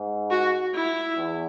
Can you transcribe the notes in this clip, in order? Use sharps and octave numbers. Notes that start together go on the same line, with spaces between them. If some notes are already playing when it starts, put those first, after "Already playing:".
Already playing: G#2
F#4
E4
E2